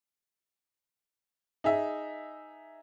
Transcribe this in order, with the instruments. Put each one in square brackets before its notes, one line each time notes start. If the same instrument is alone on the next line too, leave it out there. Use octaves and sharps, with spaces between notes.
[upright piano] D#4 G#4 E5